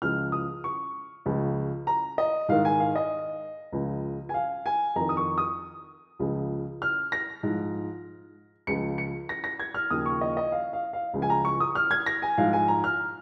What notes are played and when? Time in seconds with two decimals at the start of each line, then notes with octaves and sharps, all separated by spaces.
0.02 C#2 C#3 F3 F6
0.32 D#6
0.64 C#6
1.26 C#2 C#3 F3
1.87 A#5
2.18 D#5
2.48 G#2 D#3 F5
2.65 G#5
2.80 F5
2.96 D#5
3.72 C#2 C#3 F3
4.29 G#5
4.34 F5
4.66 G#5
4.96 F2 D#3 A#5
5.09 D#6
5.17 C#6
5.38 D#6
6.19 C#2 C#3 F3
6.82 F6
7.12 A#6
7.43 G#2 F3
8.67 C#2 C#3 F3 C#7
8.98 C#7
9.29 A#6
9.44 A#6
9.59 G#6
9.74 F6
9.90 D#2 C#3 F3 D#6
10.06 C#6
10.21 D#5
10.37 D#5
10.52 F5
10.73 F5
10.93 F5
11.13 C#2 C#3 F3
11.22 G#5
11.30 A#5
11.45 C#6
11.60 D#6
11.75 F6
11.91 G#6
12.06 A#6
12.22 G#5
12.38 G#2 F3 F5
12.53 G#5
12.68 A#5
12.84 F6